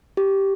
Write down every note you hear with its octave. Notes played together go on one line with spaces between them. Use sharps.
G4